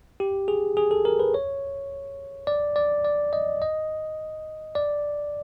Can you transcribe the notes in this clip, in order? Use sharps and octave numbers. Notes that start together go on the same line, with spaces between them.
G4
G#4
G#4
A4
A#4
B4
C#5
D5
D5
D5
D#5
D#5
D5